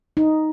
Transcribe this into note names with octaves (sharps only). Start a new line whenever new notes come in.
D#4